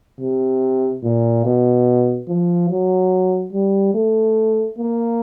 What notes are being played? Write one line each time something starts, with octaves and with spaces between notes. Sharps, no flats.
C3
A#2
B2
F3
F#3
G3
A3
A#3